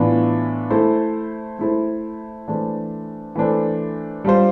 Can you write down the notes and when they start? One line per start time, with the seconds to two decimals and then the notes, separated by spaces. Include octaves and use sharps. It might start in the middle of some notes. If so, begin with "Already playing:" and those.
Already playing: A2 E3 B3 D4 F4
0.70 A3 E4 A4 C5
1.59 A3 E4 A4 C5
2.48 E3 A3 D4 A4 C5
3.36 E3 A3 D4 A4 C5
4.25 G3 D4 F4 C5